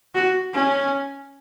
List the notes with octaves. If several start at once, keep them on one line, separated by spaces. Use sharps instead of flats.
F#4
C#4